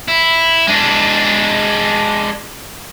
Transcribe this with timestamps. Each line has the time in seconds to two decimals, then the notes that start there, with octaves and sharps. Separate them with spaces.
0.08 E4
0.67 G#3 D4